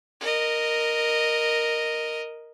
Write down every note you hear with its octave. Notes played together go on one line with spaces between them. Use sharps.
A#4 D#5